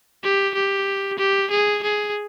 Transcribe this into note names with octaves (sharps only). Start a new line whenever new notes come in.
G4
G4
G4
G#4
G#4